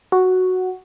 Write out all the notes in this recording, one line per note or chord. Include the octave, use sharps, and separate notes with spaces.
F#4